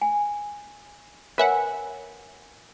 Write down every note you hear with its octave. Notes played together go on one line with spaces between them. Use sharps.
G#5
A#4 B4 C#5 E5 F#5 G#5